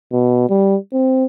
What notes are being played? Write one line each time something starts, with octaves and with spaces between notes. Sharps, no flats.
B2
G3
C4